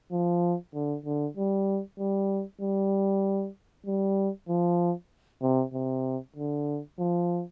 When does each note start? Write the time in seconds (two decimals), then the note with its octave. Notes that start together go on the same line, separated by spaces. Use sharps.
0.11 F3
0.74 D3
1.05 D3
1.37 G3
1.99 G3
2.61 G3
3.86 G3
4.49 F3
5.42 C3
5.74 C3
6.36 D3
6.99 F3